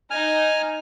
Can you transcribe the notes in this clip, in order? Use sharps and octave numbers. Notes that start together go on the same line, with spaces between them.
D#4 G#5 F6